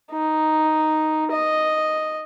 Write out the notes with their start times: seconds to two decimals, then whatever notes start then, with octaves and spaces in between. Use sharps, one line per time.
0.12 D#4
1.31 D#5